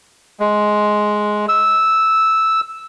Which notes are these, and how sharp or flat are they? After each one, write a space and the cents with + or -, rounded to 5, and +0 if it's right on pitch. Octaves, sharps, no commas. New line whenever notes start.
G#3 +10
E6 -5